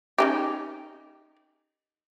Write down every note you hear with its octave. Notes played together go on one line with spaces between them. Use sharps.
C#4 D#4 G4